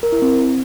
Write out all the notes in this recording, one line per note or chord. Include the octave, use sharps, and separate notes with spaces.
A#4
E4
C4